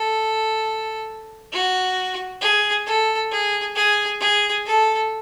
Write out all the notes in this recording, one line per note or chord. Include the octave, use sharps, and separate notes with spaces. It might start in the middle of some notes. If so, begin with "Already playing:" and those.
Already playing: A4
F#4
G#4
A4
G#4
G#4
G#4
A4